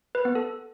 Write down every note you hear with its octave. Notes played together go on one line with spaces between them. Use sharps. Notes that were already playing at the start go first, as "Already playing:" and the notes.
B4
B3
A4